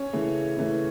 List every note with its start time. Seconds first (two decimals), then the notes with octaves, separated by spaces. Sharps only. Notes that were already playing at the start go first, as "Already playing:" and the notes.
Already playing: C#4 C#5
0.13 C#3 E3 A3
0.57 C#3 E3 A3